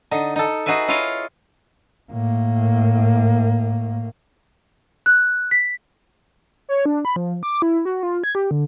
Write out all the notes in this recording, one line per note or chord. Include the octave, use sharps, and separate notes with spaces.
D3 D#4
D#4 A4
D#4 F#4 G#4 B4 E5
E4 F4 C#5 D#5 F5
A2 A#3
F#6
B6
C#5
D4
B5
F3
D6
E4
F#4
F4
G#6
G4
D3